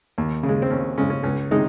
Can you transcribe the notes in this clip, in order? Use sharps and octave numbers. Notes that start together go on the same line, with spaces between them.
D#2
C#3
G#3
C4
D#2 C#4
C#3 G#3 C#4
C#4
C#2 C#4
C3 D#3 G#3 D#4